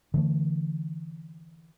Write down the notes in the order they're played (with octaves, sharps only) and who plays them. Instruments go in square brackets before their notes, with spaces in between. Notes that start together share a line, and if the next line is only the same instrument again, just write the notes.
[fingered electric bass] D3 E3 A3